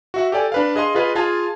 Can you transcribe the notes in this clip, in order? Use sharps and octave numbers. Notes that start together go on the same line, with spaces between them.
F#4 E5 F#5
G4 A4 D5 G#5
D4 B4 F5
G#4 D#5 F5 C6
F4 G#4 B4 D#5 F5
F4 G#4 F5 A5 G#6